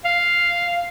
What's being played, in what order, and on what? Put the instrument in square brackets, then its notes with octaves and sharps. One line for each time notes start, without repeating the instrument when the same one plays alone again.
[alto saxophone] F5